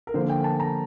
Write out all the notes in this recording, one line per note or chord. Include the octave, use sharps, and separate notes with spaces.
A#4
D3 F3 A#3 C5
G5
A5
A#5